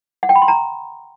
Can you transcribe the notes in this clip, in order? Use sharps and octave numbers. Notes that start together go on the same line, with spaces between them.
F#5
G5
B5
C6
A#5